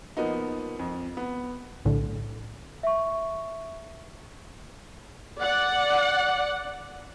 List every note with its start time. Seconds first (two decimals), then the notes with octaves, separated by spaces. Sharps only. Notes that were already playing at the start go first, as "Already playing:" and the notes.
0.17 F3 A#3 B3 D#4
0.79 F2
1.17 B3
1.85 B1 A2 D3
2.83 E5 C#6
5.40 D5 F#5